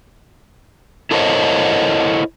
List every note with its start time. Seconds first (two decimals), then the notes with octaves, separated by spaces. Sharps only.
1.11 E4 A4 A#4 C5 C#5 D#5